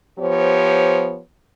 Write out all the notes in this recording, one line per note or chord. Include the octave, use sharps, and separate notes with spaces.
F3 B3 G4 C5 C#5